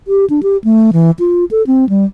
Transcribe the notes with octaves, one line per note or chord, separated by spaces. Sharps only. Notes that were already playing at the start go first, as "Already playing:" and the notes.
G4
D4
G4
A3
E3
F4
A4
C4
G3